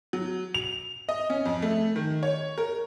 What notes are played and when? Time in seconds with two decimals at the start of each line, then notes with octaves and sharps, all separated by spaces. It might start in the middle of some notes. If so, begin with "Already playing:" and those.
0.13 F#3
0.54 F7
1.09 D#5
1.30 C#4
1.46 F2
1.62 A3
1.96 D#3
2.23 C#5
2.58 A#4